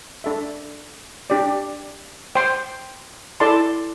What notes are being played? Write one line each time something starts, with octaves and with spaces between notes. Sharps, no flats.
D4 A4 E5
D4 G4 D5
C5 G5 C6
E4 A4 D5 A5 C6